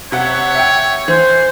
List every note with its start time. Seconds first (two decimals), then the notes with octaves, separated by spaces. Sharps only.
0.12 C3 C#5 F#5
0.55 E5 F#5 G5
1.08 E3 C5